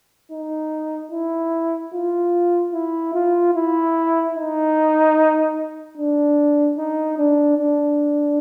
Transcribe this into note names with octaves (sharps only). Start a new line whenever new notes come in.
D#4
E4
F4
E4
F4
E4
D#4
D4
D#4
D4
D4